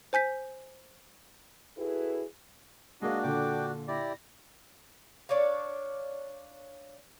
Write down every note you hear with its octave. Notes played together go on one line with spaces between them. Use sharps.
C5 G#5 G6 B6
E4 F#4 G#4 A4 B4
G#3 A#3 D4 F#4 D#5
A#2 D3 A4 G5 D6
E4 G4 D5 A#6
D4 C#5 D5 F5